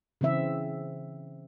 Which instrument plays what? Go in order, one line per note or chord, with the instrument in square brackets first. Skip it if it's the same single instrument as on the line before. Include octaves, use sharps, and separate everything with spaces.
[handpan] C#3 E3 C4 E5